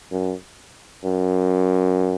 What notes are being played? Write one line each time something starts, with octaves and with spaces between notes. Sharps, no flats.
F#2
F#2